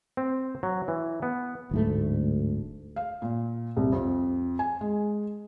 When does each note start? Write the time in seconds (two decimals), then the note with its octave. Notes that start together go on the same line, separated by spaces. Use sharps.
0.17 C4
0.63 F#3
0.88 E3
1.23 B3
1.71 D1 D2 G#2 A3
2.96 F5
3.22 A#2
3.77 C2
3.92 F2
4.59 G#5
4.81 G#3